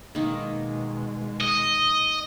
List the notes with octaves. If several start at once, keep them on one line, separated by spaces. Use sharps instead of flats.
B2 D#3 G#3 A#3
D#5